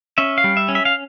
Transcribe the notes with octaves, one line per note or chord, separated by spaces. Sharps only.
C#4 E5
F5
G3
E5
C#4
E5
F5